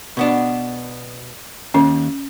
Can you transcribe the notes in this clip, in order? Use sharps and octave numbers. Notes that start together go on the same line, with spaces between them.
B2 B3 D4
D#2 C#4